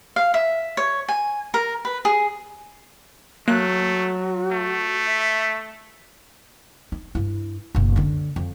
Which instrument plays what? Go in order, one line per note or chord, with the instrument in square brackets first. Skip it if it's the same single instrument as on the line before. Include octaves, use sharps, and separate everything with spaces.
[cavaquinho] F5
E5
C#5
G#5
A#4
B4
G#4
[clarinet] F#3 [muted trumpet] A3 [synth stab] A#3 F#6 [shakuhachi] F#4
[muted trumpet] A3
[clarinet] E5
[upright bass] D#4
G2 E4
F#1 B1
D3 C#4
F2